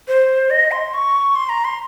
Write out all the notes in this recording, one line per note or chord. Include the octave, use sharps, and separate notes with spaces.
C5
D#5
C6
C#6
C6
A#5
C6